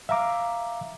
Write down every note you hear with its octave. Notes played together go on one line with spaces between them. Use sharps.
E5 F5 A#5 D6